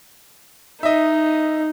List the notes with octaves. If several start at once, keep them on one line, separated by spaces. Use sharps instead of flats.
D#4 D#5 E5